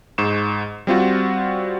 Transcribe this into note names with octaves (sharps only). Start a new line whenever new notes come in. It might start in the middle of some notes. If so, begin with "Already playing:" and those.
G#2 C#6 E7
G3 C4 F4 F#4